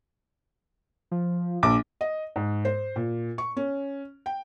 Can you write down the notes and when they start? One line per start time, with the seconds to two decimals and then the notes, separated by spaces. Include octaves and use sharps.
1.11 F3
1.63 A#1 D6
2.01 D#5
2.36 G#2
2.65 C5
2.96 A#2
3.38 C#6
3.57 C#4
4.26 G5